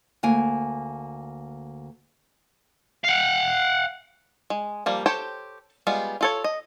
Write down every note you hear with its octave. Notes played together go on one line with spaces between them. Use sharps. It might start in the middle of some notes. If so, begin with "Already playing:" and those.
D2 A#3 G#5
F5 F#5
G#3
F3 G3 A#3
G4 A4 C5 C#5 G5
G3 G#3 B3 F4
F4 A4 C#5
D#5